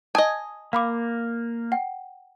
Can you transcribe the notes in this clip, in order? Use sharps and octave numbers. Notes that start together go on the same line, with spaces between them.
D#5 G#5 A5 D#6 G#6
A#3 F5 B5 D6
F#5 G5